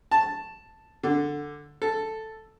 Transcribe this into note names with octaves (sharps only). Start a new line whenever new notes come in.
A5
D3
A4